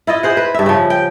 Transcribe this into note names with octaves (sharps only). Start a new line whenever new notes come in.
E4 F4 D#5
G#4 C5 F#5
B4
G2 E5
C#3 F3
G5